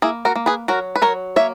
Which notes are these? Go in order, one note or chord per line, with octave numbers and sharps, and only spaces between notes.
A#3 E4 G#4
F#4 A#4
A#3
G#4 B4
F#3 F#4 A#4
B4
F#3 A#4 C#5
A#3 C#5 E5